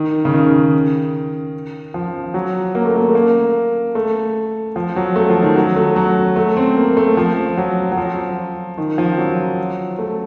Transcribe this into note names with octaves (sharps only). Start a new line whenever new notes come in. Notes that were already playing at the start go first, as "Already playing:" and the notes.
Already playing: D#3
C#3
D#3
F3
F#3
A#3
A3
A#3
A3
A#3
A3
F3
F#3
A3
F3
D#3
F#3
A3
F#3
A3
C4
A#3
A3
F3
F#3
F#3
F3
D#3
F3
F#3
A3